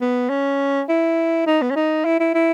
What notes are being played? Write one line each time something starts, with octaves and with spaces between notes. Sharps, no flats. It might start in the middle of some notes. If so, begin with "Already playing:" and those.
B3
C#4
E4
D#4
B3
C#4
D#4
E4
E4
E4